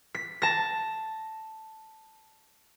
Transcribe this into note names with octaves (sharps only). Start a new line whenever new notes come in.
B6
A5 A#6